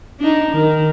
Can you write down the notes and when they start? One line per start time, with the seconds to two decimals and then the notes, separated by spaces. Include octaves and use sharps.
0.19 D4 D#4
0.51 D#3